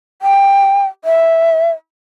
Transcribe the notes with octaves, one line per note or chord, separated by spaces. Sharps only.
G5
E5